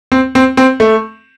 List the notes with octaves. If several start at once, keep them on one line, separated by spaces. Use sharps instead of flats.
C4
C4
C4
A3